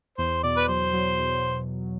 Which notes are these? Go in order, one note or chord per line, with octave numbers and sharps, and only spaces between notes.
E2 C5
B2 D5
B4
F#3 C5
F#3
E2